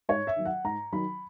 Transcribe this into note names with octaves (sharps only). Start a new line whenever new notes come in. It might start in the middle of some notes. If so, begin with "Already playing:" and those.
G#2 C#5
E5
D#3 F#3
F#5
G#2 A#5
D#3 F#3 B5